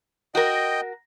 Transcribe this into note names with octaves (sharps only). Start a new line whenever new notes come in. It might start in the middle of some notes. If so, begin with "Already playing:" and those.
F#4 A#4 D#5 G5